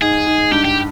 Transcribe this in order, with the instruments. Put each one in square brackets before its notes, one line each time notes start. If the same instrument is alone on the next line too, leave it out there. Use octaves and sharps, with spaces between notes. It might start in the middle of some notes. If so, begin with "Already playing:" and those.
[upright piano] G#2 [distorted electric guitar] G#4
[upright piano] G#2
[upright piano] G2 [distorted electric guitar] G4
[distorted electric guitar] G4